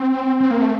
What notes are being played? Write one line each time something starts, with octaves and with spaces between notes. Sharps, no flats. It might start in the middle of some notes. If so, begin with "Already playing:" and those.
Already playing: C4
C4
A#3
A3